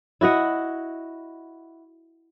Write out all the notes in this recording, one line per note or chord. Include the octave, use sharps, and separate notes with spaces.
E4 F#4 D#5 F#5